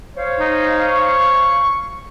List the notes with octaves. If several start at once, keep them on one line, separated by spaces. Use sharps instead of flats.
C5 C#5 F5
D#4
C#6